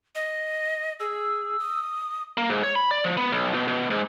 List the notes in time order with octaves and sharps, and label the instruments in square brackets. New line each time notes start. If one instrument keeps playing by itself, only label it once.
[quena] D#5
[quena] G#4 [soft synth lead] E6
[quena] D#6
[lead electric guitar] A#3
G#2
C#5
B5
D5
F3
B3
B1
B2
B2
G#2